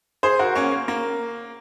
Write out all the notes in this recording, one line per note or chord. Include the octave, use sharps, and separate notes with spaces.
G#4 C5
F#4 A#4
A#3 C#4
A#3
A#3